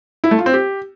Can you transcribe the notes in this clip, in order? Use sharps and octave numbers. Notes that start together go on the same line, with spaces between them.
E4
A3
F4
C4
G4